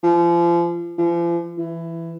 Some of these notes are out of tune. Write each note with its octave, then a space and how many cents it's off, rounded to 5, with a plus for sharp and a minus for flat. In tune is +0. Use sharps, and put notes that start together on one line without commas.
F3 -30
F3 -40
E3 +15